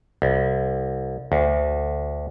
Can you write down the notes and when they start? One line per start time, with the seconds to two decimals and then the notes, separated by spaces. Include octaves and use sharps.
0.22 C2
1.32 D2